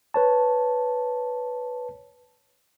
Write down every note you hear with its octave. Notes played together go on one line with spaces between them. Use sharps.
B4 C#5 A5